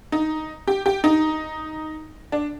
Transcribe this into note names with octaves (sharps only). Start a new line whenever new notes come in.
D#4
G4
G4
D#4
D4